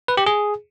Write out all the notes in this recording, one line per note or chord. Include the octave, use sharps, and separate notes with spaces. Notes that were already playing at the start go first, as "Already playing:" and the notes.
B4
G4
G#4